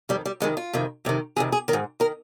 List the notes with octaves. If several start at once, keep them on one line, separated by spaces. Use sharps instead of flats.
F2 D#3 G3
G3
F2 C3 D#3 G#3
F4
F2 C3 D#3
F2 C3 D#3
F2 C3 D#3 G#4
G#4
D#3 A#4
G#2
D#3 A#4